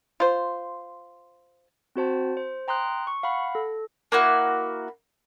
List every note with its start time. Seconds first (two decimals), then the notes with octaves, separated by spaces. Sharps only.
0.20 F4 C5
1.96 C4 F#4 C5 A5
2.37 C5
2.68 G5 A#5 C6 D#6 F#6
3.07 C#6
3.23 F5 F#5 B5
3.55 A4
4.12 A#3 E4 F#4